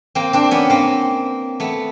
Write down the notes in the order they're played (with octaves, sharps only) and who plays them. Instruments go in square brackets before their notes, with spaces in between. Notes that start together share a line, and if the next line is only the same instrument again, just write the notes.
[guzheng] A#3 C4
C4 D4
B3 C#4
A#3 C4
A3 B3